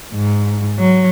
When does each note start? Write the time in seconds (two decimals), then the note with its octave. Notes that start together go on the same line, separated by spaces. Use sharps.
0.14 G#2
0.79 F#3